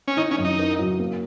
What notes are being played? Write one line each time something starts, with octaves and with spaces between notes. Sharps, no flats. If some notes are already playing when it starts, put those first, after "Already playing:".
C#4
D#3 D#4
C#4
F#2
D#4
A#4
F#3
A#3